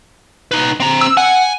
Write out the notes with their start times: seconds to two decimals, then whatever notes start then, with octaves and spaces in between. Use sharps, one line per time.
0.51 D#4 B4
0.80 C4 A#5
1.01 E6
1.17 F#5 G#5